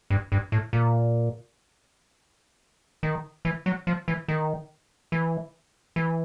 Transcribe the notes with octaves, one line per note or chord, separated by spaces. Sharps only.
G2
G2
A2
A#2
D#3
E3
F#3
F3
E3
D#3
E3
E3